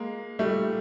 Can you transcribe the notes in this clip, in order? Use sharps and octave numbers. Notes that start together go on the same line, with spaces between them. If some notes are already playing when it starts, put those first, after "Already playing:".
Already playing: G#3 A#3
G3 A3